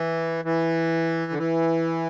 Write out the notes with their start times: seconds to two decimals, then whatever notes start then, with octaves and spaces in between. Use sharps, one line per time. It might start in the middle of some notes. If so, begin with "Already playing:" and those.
Already playing: E3
0.45 E3
1.32 D3
1.38 E3